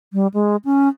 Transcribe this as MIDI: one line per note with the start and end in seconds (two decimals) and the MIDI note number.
0.13 0.27 55
0.34 0.56 56
0.65 0.88 61